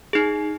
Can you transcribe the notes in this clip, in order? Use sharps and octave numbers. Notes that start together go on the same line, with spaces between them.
D#4 G#4